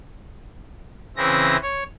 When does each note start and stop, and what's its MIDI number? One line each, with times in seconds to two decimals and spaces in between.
1.17 1.57 49
1.17 1.57 52
1.17 1.57 60
1.17 1.57 64
1.17 1.57 94
1.62 1.83 73